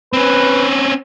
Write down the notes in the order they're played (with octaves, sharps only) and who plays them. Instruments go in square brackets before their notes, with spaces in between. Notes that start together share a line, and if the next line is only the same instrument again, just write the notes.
[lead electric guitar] C4 C#4 [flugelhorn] B4